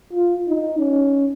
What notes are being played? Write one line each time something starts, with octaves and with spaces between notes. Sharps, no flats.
F4
D#4
C#4